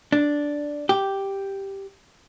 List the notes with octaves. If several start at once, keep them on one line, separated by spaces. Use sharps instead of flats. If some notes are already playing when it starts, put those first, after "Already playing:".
D4
G4